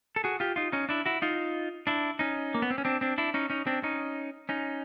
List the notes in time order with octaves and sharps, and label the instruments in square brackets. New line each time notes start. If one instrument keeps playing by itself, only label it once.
[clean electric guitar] A4
F#4 G#4
F4 G4
D#4 F4
C#4 D#4
D4 E4
E4 F#4
D#4 F4
D4 E4
C#4 D#4
A#3
B3
C4
C#4
C4 D4
C4 D4
D4 E4
C#4 D#4
C#4 D#4
C4 D4
C#4 D#4
C#4 D#4